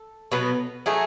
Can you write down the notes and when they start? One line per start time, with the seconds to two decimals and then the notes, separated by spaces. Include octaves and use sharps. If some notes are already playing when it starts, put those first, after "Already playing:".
Already playing: A4
0.32 B2 F#3 B3
0.86 F#3 A3 D#4 G#4